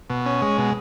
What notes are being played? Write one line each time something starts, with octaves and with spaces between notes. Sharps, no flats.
B2
C#4
G#3
B2